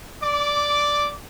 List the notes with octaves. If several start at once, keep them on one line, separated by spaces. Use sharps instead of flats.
D5 D6